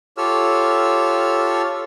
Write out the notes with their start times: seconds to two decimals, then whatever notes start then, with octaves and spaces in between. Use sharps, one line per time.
0.18 F4 G4 A4 C#5 E6 F6